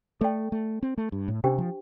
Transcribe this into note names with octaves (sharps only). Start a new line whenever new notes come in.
A3 A4 D5 G5
A3
C4
A3
G2
A2
C3 D4 G4 C5 G5
F3